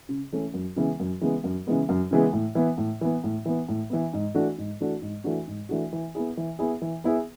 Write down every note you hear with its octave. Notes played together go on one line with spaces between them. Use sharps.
C#3
E3 A3 C#4
F#2
C#3 E3 G#3 B3
F#2
C#3 E3 G#3 B3
F#2
C#3 E3 G#3 B3
F#2
C#3 E3 G#3 B3
A2
E3 B3
A2
E3 B3
A2
E3 B3
A2
E3 B3
G#2
E3 A3 D4 F#4
G#2
E3 A3 D4 F#4
G#2
E3 A3 D4 F#4
G#2
E3 A3 D4 F#4
E3
B3 E4 G#4
E3
B3 E4 G#4
E3
B3 E4 G#4